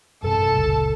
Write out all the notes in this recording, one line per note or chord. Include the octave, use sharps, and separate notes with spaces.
A1 G2 C3 A4 A5
F#1 C#2 A#2